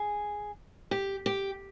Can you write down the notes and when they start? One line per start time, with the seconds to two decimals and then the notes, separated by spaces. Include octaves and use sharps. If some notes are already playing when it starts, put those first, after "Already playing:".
Already playing: G#4
0.91 G4
1.26 G4